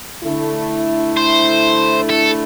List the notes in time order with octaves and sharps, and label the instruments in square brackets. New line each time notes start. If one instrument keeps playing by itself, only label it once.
[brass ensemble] D3 A3 E4
[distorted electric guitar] C5
A4